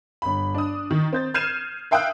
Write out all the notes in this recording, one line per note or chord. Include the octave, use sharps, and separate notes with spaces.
G1 B5
D4 D#6
D#3
C4 G6 A6
F6 G6 G#6 C7 D#7 E7
E5 F5 G5 D#6 E6 F#6